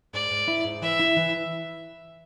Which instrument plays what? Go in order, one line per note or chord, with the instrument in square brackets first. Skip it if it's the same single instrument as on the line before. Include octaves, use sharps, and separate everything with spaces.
[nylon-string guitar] G#2 [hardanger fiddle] D5
[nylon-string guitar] G#2
E4
G#2
[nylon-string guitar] E3 [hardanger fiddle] E5
[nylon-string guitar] E4
E3